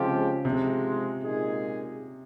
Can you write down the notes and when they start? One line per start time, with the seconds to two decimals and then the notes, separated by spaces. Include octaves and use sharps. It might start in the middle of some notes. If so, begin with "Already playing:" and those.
Already playing: C#3 F3 G#3 C4 G4
0.45 G#2 C3 F3 G#3
1.22 A#2 G#3 D#4 G#4